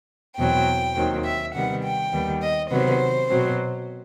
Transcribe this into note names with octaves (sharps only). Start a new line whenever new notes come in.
E2 B2 F#3 C4 G5
D#2 D#3 F#3 C4
E5
C3 D#3 G3 B3 F#5
G5
D#2 D#3 G3 B3
D#5
C3 D#3 F#3 B3 C5
B2 F#3 C4